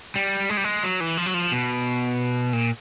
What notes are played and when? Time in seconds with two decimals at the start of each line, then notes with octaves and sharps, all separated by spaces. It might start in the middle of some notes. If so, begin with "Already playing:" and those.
0.16 G3
0.49 G#3
0.57 G3
0.64 G#3
0.83 F#3
1.00 E3
1.17 F3
1.26 F#3
1.34 F3
1.52 B2
2.53 A#2